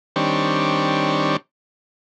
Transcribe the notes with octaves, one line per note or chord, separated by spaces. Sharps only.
D#3 G3 C4 D4 C#5